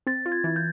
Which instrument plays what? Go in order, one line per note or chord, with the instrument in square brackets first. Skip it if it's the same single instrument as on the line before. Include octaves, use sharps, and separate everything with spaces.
[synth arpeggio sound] C4 [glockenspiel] A6
[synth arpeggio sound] F4
[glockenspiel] G#6
[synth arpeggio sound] E3
[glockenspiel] G6